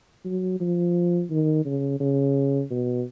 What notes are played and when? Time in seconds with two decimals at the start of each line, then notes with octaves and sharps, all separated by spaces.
0.25 F#3
0.60 F3
1.30 D#3
1.65 C#3
2.00 C#3
2.71 B2